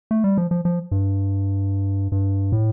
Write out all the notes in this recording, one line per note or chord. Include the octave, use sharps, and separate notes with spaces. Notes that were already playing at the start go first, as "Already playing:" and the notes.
A3
G3
F3
F3
F3
G2
G2
A2